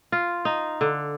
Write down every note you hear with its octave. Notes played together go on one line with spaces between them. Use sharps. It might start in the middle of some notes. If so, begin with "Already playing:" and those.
F4
D#4
D3